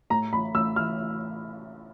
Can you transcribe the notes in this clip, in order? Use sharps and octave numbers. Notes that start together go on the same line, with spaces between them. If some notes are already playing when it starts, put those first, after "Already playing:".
A2 A#5
A1 B5
A1 E6
E3 F6